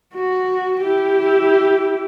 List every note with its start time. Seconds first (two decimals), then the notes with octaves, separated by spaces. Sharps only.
0.14 F#4
0.81 E4 G4